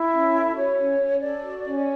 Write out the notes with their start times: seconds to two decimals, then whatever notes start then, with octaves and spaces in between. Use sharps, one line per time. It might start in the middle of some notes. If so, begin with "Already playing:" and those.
Already playing: E4 E5
0.11 C#4
0.32 A4
0.54 F#4 C#5
0.76 C#4
0.98 C#4
1.19 A4 D5
1.41 F#4
1.63 C#4